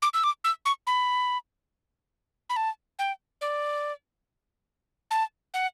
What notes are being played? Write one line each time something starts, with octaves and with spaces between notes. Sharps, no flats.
D6
E6
D6
E6
C#6
B5
B5
A5
G5
D5
A5
F#5